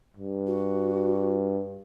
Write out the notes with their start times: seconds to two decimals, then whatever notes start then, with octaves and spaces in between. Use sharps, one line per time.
0.17 G2
0.47 F#4